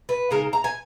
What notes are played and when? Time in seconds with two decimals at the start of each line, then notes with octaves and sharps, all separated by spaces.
0.09 B4
0.31 C#3 G#3 D#4 A#4
0.53 A#5
0.64 G#5